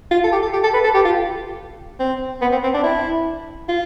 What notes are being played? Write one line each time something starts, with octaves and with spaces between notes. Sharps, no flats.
F4
A4
G4
A4
G4
A4
B4
A4
G4
F4
C4
B3
C4
C4
D4
E4
F4